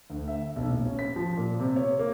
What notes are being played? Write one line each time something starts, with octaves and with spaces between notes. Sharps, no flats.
D2
E5
B1
D#1
C#4
B6
F3
A#2
C3
C#5
A#3